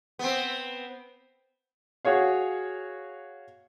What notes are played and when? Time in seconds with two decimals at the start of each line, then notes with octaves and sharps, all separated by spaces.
0.19 B3 C4
2.05 F#4 G#4 C#5 F5